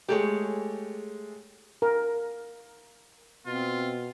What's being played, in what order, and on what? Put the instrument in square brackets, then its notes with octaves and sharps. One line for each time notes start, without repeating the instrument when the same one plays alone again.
[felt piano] G#3 A3 [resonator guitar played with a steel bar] G4 G#4 C#5
[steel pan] A#4
[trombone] B2 [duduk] C4 [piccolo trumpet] F4